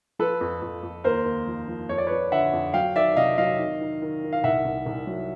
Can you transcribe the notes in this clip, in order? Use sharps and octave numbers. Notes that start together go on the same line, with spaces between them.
F3 A4 B4
F2
F2
F2
D#2 A#4 C5
D#2
F3
F3
F2 C#5
D5
F2 B4 C#5
D3 E5 F#5
F2
F#3 F5 G5
D#3 D5 E5
C3 D#5 F5
F#3 D#5 F5
D#3
D#3
D#3
D#3
F5
C2 E5 F#5
C2
C2
F#3